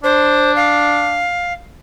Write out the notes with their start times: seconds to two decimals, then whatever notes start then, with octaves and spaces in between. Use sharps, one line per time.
0.04 D4 C5
0.56 F5